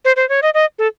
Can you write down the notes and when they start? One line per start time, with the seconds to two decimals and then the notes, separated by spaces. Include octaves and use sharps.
0.05 C5
0.16 C5
0.29 C#5
0.42 D#5
0.54 D#5
0.79 A4